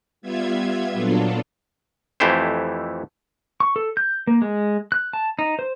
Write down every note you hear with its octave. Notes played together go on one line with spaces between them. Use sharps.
G3 B3 F4 E5 G#6
A#2 F#3 B3 D4 F4 A4
F2 E3 A3 E4 G4 C5
C#6
A4
G6
A#3
G#3
F#6
A5
D#4
C5